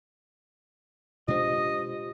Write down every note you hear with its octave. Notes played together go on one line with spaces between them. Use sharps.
B2 G#3 D4 F4 G4 C5 D#5